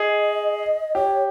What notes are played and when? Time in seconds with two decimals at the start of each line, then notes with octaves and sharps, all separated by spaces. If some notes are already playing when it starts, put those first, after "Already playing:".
Already playing: G#4 D#5
0.95 G4 C#5